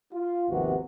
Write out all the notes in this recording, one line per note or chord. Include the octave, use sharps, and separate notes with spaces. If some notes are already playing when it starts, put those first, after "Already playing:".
F4
G#1 D#2 C3 F3 B3 F#4